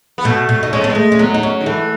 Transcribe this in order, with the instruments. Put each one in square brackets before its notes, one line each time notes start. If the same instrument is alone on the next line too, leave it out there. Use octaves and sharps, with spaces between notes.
[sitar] B3
[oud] B2 [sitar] A3
[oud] B2
D#4
[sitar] G#3 [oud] C#4
[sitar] A3 [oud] B3
[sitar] G#3
[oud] A3
C#4
[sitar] F#3 [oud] B3
[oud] D#4
C#4
[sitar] D#3
[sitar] E3 [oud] A3